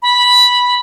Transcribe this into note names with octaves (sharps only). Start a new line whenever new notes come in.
B5